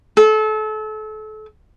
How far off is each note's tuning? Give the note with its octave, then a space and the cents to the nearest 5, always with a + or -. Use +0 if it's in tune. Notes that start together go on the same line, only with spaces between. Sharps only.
A4 -30